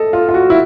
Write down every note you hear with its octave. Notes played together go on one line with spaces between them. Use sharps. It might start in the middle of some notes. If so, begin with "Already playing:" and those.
Already playing: A4 D#5
F4
F4
F#4
E4